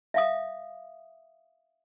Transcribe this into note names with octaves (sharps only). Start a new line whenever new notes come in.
E5 F5 D#6